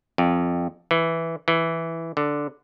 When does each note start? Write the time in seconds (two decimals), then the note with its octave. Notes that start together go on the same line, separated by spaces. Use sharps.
0.18 F2
0.91 E3
1.48 E3
2.17 D3